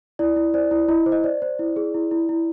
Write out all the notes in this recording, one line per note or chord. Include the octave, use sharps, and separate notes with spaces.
E4 D5
E4
C5 D5
E4
E4 D#5
C5
D#5
C5 D5
C5
E4
G#4
E4
E4
E4